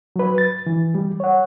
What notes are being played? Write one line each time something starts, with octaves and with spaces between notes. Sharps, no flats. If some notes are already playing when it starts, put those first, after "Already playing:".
F#3 B4
A6
E3
G3
C#5 F#5